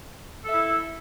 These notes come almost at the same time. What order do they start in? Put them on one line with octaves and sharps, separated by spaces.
A4 E5 E4